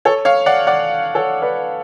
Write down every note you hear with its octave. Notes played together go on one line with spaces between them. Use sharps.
A4 C#5
C#5 F5
D5 F#5
D5 F#5
A4 C#5
B4 D5